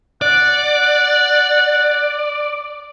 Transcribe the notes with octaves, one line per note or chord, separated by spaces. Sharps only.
D5 F#5